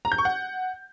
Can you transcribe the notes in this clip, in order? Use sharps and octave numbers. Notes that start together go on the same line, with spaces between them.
A#5
G6
C#6
F#5